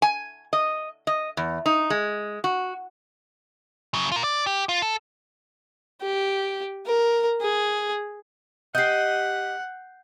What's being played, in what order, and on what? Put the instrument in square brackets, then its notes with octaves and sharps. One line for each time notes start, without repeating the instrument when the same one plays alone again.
[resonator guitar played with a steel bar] G#5
D#5
D#5
E2
D#4
G#3
F#4
[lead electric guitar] C#3 F#3
F4 A#4
D5
G4
F4
A4
[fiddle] G4
A#4
G#4
[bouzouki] G4 D#5 [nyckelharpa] F#5 [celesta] G6 C7